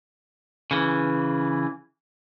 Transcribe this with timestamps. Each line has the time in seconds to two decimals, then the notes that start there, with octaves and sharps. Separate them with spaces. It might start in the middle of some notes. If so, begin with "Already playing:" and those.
0.71 C#3 E3